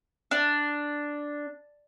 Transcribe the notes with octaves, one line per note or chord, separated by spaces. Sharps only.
D4